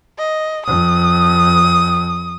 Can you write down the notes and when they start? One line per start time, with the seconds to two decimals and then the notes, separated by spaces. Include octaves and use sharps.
0.19 D#5
0.66 F2 D#6